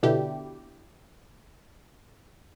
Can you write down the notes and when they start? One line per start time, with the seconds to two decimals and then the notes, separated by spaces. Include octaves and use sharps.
0.03 B2 D3 D4 E4 G4